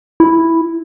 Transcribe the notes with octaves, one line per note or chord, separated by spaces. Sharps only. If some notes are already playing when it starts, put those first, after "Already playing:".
E4